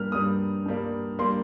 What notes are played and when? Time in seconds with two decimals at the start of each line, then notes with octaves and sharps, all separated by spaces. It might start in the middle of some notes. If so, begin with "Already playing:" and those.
Already playing: G2 G3 A#3 F6
0.12 G2 G3 A#3 D#6
0.66 G2 G3 A#3
1.19 G3 A#3 C6